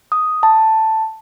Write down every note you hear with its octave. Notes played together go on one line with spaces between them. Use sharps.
D#6
A5